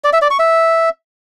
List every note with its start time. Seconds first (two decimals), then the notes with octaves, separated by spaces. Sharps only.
0.04 D5
0.13 E5
0.22 D5
0.31 C#6
0.39 E5